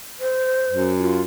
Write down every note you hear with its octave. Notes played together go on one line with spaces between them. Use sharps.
C5
F#2
F4